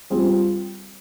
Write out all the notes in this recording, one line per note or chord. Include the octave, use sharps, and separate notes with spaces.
G3 C4 F4 G#4